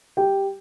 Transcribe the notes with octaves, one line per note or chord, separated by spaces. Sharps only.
G4 G5